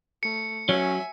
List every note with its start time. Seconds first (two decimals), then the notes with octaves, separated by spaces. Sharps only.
0.23 A3 C#7
0.69 F#3 C#4 E5 G#5